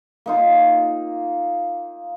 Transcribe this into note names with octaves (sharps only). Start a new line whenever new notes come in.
A#3 D#4 F4